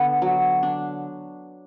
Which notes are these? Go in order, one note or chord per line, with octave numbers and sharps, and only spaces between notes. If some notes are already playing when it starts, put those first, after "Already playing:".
Already playing: D3 B3
F#3
D4